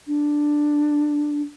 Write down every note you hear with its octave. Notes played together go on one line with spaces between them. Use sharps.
D4